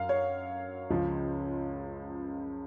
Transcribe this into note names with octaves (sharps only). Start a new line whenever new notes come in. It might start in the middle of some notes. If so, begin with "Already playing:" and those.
Already playing: F#2 F#3 F5
C#5
C#2 C#3 F3